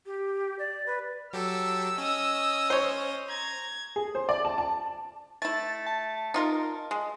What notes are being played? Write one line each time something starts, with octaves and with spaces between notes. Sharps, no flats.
G4
D5
B4
F#3 G4 A4 E6
C#4 D#5 D#6
C5 C#5
A#5 G#6
G#4
C5
D5
A5
A5
A3 E4 A6
A5
D#4 F4 A#4
G#3